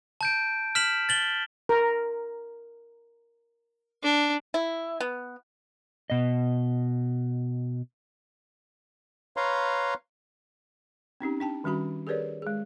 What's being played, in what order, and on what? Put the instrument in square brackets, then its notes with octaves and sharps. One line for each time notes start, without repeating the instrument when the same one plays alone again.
[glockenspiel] A5 G6 D7
F6 B6 E7 F#7
A6 F#7 G7
[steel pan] A#4
[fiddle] D4
[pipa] E4
B3
[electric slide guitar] B2 D#5
[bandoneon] B4 C#5 F5 A#5 C6
[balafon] C4 C#4 D#4 G4
D4 G5 A5
D#3 G3 C#4 F#4 B5
G4 G#4 A#4 B4 C#5 D5
G#3 G#4